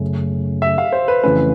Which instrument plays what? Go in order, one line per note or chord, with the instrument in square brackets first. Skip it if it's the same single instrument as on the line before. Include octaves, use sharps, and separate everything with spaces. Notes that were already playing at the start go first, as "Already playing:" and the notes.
Already playing: [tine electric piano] F#2 C#3 F#3 A3 C#4
[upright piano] E5
F5
C5
B4
[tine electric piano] F2 C#3 E3 A3 C#4 [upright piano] B4